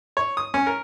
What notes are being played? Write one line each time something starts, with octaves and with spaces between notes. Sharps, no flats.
C#5
D#6
C#4
A#4